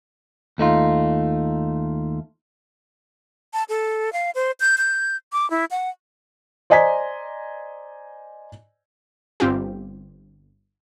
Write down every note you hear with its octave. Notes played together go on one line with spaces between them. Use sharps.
D#2 A3 D#4 F4
A5
A4
F5
C5
G6
G6
D6
E4
F#5
C5 D5 D#5 G#5 A#5 B6
G1 C4 F4 G4